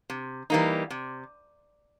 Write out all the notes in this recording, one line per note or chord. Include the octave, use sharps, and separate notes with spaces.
C3
E3 G3 A#3 D#4
C3